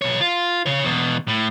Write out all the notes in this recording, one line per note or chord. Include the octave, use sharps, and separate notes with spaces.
B1 C#5
F4
C#3 C#5
E2 B2
A2